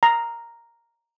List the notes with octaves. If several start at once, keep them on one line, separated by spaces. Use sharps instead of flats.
A#5